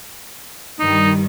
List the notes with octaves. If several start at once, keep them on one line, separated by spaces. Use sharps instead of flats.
G2 D#3 G3 D#4